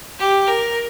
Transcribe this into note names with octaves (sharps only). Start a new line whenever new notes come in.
G4
A#4